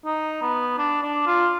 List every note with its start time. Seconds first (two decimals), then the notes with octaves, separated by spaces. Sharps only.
0.05 D#4
0.42 B3
0.78 D4
1.03 D4
1.27 F4